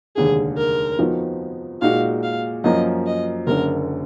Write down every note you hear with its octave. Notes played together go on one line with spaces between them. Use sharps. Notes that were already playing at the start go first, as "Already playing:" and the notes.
F1 D#2 D3 G#3 G#4
A#4
F2 F3 B3 D#4 F#4
A#2 G#3 D#4 F#4 F5
F5
F#2 F3 A#3 D#5
D#5
F#1 F#2 D3 A#4